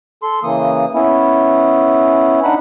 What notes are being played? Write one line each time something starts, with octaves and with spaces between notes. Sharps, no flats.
A4 C6
C#3 E3 A#3 D#6
B3 C#4 E4
D4 D#4 F#5 B5